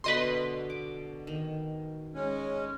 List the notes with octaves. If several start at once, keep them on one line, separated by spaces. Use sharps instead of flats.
B2 D3 B4 D#5 C6
D6
D#3
G#3 C#4